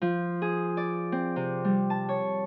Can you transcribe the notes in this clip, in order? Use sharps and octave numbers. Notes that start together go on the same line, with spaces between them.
F3
G#4
D5
C4
C3
G3
A5
C#5